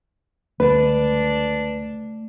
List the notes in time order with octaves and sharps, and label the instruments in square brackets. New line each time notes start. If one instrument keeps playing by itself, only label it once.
[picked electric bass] C#2 D3 G3 [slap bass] A3 [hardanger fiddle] D4 [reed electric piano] B4